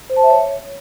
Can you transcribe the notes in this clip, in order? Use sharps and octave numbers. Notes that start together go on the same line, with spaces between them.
C5
A5
E5
C#5